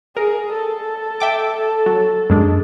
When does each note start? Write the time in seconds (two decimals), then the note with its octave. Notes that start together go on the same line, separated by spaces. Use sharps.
0.17 G#4 A#4
0.53 A4
1.20 E5 G5 D6
1.86 F#3
2.30 F#2 G#3 D4